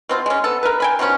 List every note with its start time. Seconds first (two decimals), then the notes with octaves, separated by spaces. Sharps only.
0.09 B2 C4 F4
0.26 G#3 C#4
0.44 B3 A4
0.63 A#4 B4
0.80 G5 G#5 B5
0.99 B2 D#3 F3 C#4